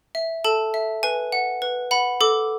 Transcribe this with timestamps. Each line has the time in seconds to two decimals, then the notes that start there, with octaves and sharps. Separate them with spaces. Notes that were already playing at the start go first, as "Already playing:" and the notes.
0.15 E5
0.44 A4 A5
0.74 E5
1.03 B4 G#5
1.32 F#5
1.62 B4
1.91 F#5 B5
2.21 A4 D6